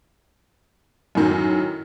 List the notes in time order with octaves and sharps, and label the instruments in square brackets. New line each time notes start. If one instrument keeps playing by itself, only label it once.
[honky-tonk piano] F#2 A2 D#3 F#3